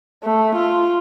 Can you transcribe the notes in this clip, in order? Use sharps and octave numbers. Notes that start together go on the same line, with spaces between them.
A3
F4